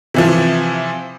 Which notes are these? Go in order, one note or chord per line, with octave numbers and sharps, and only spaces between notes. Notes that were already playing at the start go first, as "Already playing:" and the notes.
C3 E3 F3